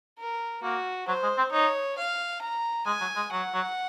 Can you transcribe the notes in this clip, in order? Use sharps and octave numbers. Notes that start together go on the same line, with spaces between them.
A#4
A#3 F#4
F#3 C5
G#3
C4
D#4 C#5
F5
A#5
G#3 G#5
F#3
G#3
F#3 F#5
F#3